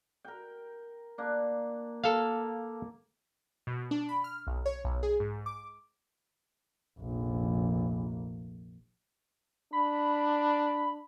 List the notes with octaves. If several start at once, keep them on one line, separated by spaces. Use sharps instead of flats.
A#4 G5
A#3 D4
A#3 A4 F5 A5
B2
D4
B5
F6
B1
C#5
B1
G#4
G#2
D6
F1 A#1
D4 B5